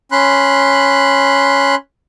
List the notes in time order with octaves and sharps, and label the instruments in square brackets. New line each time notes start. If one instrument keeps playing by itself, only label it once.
[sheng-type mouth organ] C#4 B5 C6 F#6